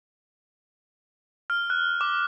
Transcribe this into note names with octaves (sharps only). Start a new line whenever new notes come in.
F6
F#6
D6